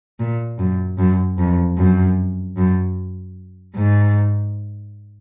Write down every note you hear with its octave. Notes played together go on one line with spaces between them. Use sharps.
A#2
F#2
F#2
F2
F#2
F#2
G#2